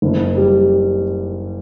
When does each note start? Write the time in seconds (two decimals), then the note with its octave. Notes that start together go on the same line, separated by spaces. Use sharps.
0.02 F#1
0.37 G3